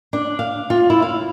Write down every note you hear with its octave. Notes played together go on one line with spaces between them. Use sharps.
D4
F5
F4
E4
F5